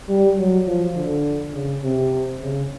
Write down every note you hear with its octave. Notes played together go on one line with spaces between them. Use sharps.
G3
F#3
F3
D3
C#3
C3
C#3